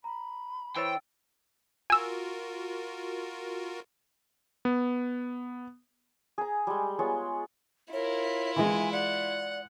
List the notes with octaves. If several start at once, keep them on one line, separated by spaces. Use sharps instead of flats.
A#5 B5
E3 C5 C#5 G5 E6 A6
F4 F#4 A#4 G#5 E6
B3
G#4 A#5
G3 G#3
G#3 B3 F4 C#5
E4 F4 A#4 C#5
E3 G#3 G#5
D5 F#5